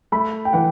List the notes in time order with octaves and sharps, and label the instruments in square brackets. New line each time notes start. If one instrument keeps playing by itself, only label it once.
[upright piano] A3 [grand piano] B5
[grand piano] G5
[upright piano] E3 [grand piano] F#5